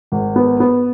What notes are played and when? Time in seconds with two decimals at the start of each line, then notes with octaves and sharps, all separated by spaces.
0.12 G#1
0.36 B3
0.60 B3